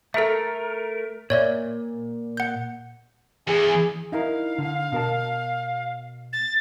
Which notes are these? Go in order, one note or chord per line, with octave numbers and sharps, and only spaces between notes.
A3 A4 A#4 E5
A#2 C#5 D5 E5
F#5 G6
E2 G#4
D#4 E4 A#4 F5
D3
B2 A#4 A5
A6